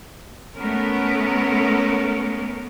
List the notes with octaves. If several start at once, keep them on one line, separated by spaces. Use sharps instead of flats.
A3 B3 C#4 A#4